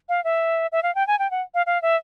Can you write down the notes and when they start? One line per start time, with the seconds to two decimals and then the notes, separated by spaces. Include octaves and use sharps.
0.09 F5
0.24 E5
0.72 E5
0.83 F5
0.95 G5
1.07 G#5
1.19 G5
1.31 F#5
1.54 F5
1.66 F5
1.82 E5